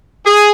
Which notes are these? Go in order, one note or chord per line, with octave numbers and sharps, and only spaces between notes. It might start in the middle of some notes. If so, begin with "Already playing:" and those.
G#4